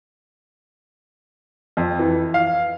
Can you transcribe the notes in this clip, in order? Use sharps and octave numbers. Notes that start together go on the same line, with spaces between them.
F2
E3
F5